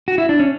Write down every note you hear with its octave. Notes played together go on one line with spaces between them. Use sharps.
F#4
E4
D4
C#4